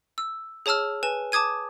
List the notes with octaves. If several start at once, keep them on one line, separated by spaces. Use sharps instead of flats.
E6
G#4 C#5 A5 E6 F6
B4 G#5 E7
A5 D6 D#6 G#6 D#7